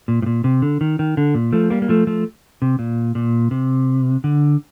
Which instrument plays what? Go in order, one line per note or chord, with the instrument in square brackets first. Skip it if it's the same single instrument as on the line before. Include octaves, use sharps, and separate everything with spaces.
[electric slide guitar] A#2
A2
A#2
C3
D3
D#3
D#3
D3
A#2
F3 A3
G3 A#3
A#3
F3 A3
F3 A3
C3
A#2
A#2
C3
D3